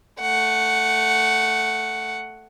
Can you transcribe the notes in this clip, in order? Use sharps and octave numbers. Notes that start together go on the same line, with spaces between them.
A3 F#5